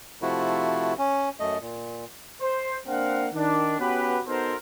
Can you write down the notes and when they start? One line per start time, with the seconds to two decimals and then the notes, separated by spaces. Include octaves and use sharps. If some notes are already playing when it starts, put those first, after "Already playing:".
0.22 C3 F3 A3 E4 F#4
0.98 C#4
1.40 F#2 A3 D#5
1.61 A#2
2.41 C5
2.86 A#3 C4 D4 A#4 F5 F#5
3.34 D#3 D4
3.79 B3 C#4 F#4 G4 B4
4.27 B3 D#4 F#4 A4 A#4 C5